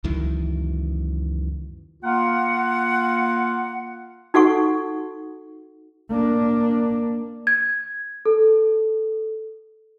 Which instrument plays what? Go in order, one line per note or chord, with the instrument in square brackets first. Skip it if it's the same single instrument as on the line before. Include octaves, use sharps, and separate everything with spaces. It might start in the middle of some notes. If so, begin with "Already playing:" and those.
[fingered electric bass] C#2 F#2 D#3 E3
[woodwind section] A#3 F4 F#5
[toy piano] D#4 F#4 A4 F#5 C#6
[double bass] A#3 D4
[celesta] G#6
A4